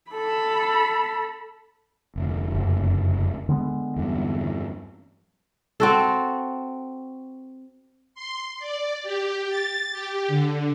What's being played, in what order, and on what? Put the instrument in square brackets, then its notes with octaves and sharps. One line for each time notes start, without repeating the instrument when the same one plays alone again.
[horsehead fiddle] A4 B5
[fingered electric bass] F1 D2
[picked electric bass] F#1
D3 G#3 B3
[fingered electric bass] E2 G2
[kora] C4 F#4 A4
[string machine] C6
D5
G4
A6
G4
D3